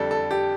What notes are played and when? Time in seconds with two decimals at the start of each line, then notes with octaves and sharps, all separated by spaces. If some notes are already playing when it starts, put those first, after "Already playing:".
Already playing: F2 D3 G3 A4
0.11 A4
0.31 G4